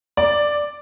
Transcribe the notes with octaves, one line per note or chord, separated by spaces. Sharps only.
D5